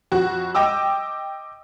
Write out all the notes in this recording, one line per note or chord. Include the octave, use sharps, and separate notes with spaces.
F2 F#4
D#5 G5 D6 E6